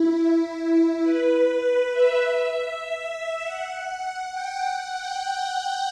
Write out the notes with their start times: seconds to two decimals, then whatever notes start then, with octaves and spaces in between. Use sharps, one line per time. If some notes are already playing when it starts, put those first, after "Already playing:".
Already playing: E4
1.03 B4
1.63 B4
1.92 E5
3.43 F#5
4.02 F#5
4.32 G5
4.62 F#5
4.92 G5
5.21 F#5
5.50 F#5